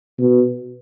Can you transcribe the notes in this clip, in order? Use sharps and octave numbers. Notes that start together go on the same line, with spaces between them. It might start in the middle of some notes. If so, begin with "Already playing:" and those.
B2